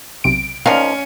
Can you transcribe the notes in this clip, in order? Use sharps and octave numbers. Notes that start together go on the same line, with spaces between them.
B1 C3 D7
D#3 F3 C#4 F5